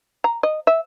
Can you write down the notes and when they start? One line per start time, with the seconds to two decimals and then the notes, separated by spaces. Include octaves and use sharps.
0.24 A#5
0.43 D#5
0.67 E5